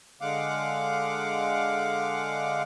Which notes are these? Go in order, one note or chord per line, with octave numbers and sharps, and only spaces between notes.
D3 G#3 F5 F#5 D6